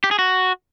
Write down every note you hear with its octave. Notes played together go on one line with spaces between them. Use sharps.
G4
G#4
F#4